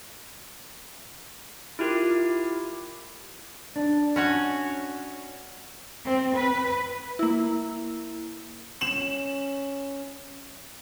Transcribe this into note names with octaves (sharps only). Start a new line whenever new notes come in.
E4 F4 G4 A#4
D4
C#4 F#4 C#5
C4
B4
A#3 E4
C#4 E7 F#7